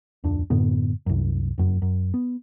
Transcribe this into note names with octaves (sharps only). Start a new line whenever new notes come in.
D1 F2 D4
F#2 A2 D3 B3
C2 F#2
F1 F#2
F#2
B3